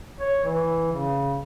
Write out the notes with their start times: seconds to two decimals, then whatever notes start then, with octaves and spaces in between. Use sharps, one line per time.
0.20 C#5
0.44 E3
0.92 C#3